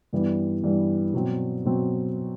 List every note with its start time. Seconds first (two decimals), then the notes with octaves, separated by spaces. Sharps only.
0.13 G2 E3 G3 B3
0.64 G2 E3 G3 B3
1.13 B2 F#3 C4
1.65 B2 F#3 C4